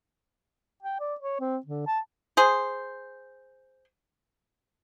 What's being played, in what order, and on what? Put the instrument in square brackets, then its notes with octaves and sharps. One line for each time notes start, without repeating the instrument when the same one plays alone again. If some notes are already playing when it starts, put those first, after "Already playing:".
[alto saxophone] G5
D5
C#5
C4
D3
A5
[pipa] G#4 C5